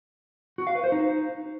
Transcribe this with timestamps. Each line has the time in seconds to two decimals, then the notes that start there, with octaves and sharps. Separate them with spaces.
0.58 F#4
0.67 F5
0.75 B4
0.84 C5
0.92 D#4